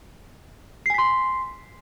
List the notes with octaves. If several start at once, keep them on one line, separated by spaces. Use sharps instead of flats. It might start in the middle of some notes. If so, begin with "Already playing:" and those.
G#5 C6 B6 C7